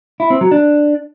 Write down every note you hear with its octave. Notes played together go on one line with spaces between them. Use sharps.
E4
C4
F#3
D4